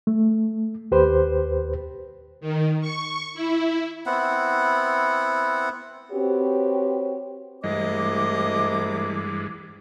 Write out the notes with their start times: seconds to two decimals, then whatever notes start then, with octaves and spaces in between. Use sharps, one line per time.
0.07 A3
0.91 D#2 G4 B4 C5
2.41 D#3
2.81 C#6
3.34 E4
4.06 B3 C4 E4 F#5
6.12 C4 F#4 G4 B4 C#5
7.64 C2 G2 E3 G#3 A3 D#5 D6